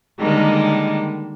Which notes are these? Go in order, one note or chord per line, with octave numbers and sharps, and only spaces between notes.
D3 D#3 G3 G#3 A#3